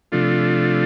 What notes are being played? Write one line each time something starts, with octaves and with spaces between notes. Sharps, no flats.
C3 F3 A3 D4 F4